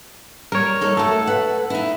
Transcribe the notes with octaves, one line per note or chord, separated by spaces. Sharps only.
G3 A#4 C#5
D#4 A4
A3 F#4 A4
B4 F#5
D#4 E4